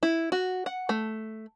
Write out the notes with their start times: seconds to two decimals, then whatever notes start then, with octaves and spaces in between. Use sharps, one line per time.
0.03 E4
0.32 F#4
0.66 F#5
0.89 A3